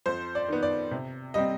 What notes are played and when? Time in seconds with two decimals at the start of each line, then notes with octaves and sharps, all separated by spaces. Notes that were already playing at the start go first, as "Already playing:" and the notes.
0.06 F2 C5
0.35 D5
0.48 D#3 B3
0.63 D5
0.91 C3
1.34 G3 C4 D#5